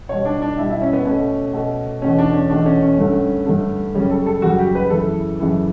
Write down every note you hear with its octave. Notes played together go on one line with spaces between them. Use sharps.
B2 G3 C#5
D4
D4
B2 G3 E4
E4
C#4
B3
B2 A3 C#4
B2 A3
E2 B2 A3 C#4
D4
C#4
E2 B2 A3 D4
C#4
C#4
G2 D3 A3
G2 D3 A3
F#2 C#3 G3 C#4
A4
A4
F#2 C#3 G3 F#4
G4
B4
F#2 C#3 E3 A4
F#2 C#3 E3